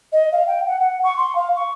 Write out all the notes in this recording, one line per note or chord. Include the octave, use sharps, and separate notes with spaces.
D#5
F5
G5
F#5
F#5
C#6
C6
F5
C#6